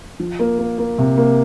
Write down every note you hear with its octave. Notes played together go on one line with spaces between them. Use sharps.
F3
A#3
A#3
A#3
C3
A#3